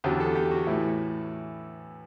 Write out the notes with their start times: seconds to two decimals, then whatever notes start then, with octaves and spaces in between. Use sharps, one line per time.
0.04 E2 D3 F#3 G4
0.20 A4
0.35 G4
0.51 F#4
0.67 A2 E3 E4